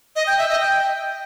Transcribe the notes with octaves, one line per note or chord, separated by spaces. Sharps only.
D#5
G5
E5
D#5
G5